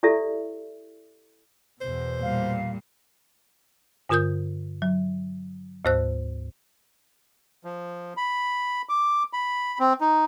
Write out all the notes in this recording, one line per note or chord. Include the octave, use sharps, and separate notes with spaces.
E4 G4 A4 D5 E5
E2 B2 C5
A#2 G3 F5
G2 D3 F4 A#4 D#6 G6
F#3
D2 G#2 C5 E6 F#6
F3
B5
D6
B5
C4
D#4